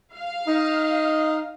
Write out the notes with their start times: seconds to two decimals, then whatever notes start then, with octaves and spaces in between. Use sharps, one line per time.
0.13 F5
0.47 D#4